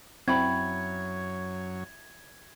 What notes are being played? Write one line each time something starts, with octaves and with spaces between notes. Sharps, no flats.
F#2 F#3 C4 E4 C#5 B5 G#6